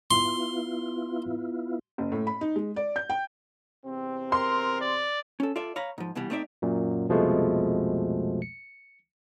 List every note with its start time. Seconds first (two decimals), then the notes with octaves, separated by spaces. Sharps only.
0.11 B3 E4 F4 C6
1.98 F#1
2.12 A2
2.27 B5
2.41 D#4
2.56 G#3
2.76 D5
2.96 G6
3.10 G5
3.84 E2 C3 C4
4.32 A#4 C6
4.81 D5
5.40 C#4 A4
5.56 F4 A4 D5 E5
5.76 C#5 F5 A#5 B5
5.98 G#2 F3
6.15 C2 B2 E3 G3
6.30 A3 B3 C4 D#4 D5 E5
6.62 F#2 A#2
7.08 C2 F2 B2 F3 G#3 A3
8.42 C#7